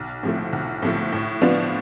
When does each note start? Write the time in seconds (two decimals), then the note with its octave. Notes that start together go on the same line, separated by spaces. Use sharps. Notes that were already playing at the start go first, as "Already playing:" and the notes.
Already playing: B1
0.23 A2 F3 A3
0.53 B1
0.82 A2 F3 A3
1.13 A2
1.42 F3 B3 D4 F4